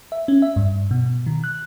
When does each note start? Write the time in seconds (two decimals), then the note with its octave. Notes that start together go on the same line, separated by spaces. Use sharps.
0.12 E5
0.28 C#4
0.42 E5
0.56 G2
0.91 B2
1.26 D#3
1.44 F#6